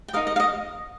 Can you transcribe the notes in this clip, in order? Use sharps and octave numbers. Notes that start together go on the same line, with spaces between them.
G5
D#4 A#4 D#5 F5
D#5
F5
D#5